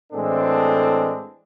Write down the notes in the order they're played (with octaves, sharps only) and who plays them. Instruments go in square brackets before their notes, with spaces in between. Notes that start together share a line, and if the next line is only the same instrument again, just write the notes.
[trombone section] A2 E3 G#3 C4 D4 A4